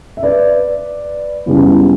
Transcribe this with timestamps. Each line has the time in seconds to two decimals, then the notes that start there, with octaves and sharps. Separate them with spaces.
0.17 E5
0.23 B4 D5
1.46 F#2 C#3 G3 B3 E4
1.67 E4